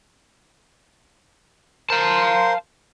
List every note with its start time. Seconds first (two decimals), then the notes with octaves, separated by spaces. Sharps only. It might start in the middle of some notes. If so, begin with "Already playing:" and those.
1.90 A#4 C5 F5 A5 C6